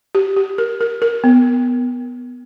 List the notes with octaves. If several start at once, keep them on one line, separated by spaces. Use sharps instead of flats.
G4
G4
A#4
A#4
A#4
B3